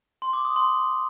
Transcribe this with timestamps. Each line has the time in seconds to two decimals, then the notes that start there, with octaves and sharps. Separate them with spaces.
0.22 C6
0.33 D6
0.45 D#6
0.56 C6